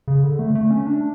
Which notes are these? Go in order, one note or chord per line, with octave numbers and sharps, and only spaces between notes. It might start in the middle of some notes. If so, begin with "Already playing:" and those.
C#3
D3
A3
A3
C#4
D4